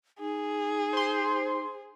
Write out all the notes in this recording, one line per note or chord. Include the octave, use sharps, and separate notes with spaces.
D#4 G#4
C5 C6